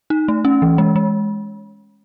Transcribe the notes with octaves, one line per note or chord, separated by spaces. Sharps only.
D#4
A3
C#4
E3
G#3
G#3